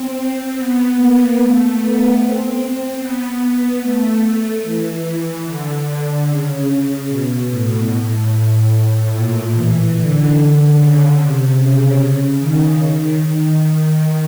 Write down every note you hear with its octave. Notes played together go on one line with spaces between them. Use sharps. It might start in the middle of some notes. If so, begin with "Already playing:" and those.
Already playing: C4
B3
A#3
A3
B3
C4
B3
A3
E3
D3
C#3
B2
A2
A#2
E3
D3
C#3
C3
C#3
D#3
D#3